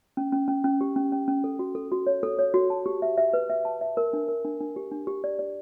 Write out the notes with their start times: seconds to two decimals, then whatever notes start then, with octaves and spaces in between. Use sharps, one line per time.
0.17 C#4
0.32 C#4
0.48 C#4
0.64 C#4
0.81 G4
0.96 C#4
1.12 C#4
1.28 C#4
1.44 A4
1.59 F#4
1.75 A4
1.92 F#4
2.07 C#5
2.23 A4
2.39 C#5
2.54 F#4
2.70 A5
2.86 G4
3.02 E5
3.18 E5
3.33 B4
3.50 E5
3.65 A5
3.81 E5
3.97 A#4
4.13 D4
4.29 A#4
4.45 D4
4.61 D4
4.76 G4
4.92 D4
5.07 G4
5.24 D5
5.39 D5